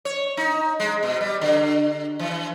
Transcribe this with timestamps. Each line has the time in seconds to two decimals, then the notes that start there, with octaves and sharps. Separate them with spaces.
0.05 C#5
0.37 D#4
0.80 G#3
1.03 B2
1.21 G3
1.41 D3
2.19 E3